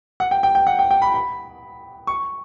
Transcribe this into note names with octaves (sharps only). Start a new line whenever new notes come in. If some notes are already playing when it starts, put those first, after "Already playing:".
F#5
G5
G5
G5
F#5
G5
G5
B5
B5
C#6